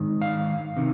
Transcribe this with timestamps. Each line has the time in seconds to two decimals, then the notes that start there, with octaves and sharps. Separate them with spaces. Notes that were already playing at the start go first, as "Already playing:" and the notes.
Already playing: G#2 D#3
0.22 F5
0.77 C3 D#3